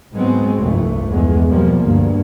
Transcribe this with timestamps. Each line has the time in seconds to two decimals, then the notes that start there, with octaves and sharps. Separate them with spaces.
0.13 G#2 F#3 G#3 B3 C4
0.60 F1 C2 G2 A3
1.09 E2 G#3
1.47 B2 F3 G3 A#3
1.79 D2 G2 A#3